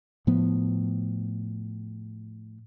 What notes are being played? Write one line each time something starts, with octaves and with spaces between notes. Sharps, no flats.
A2 F3 B3